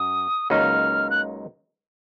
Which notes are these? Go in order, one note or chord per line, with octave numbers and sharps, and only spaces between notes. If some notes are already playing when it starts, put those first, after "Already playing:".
Already playing: F#2 D#6
C#2 C#3 F#3 A#3 D#4 F6
F#6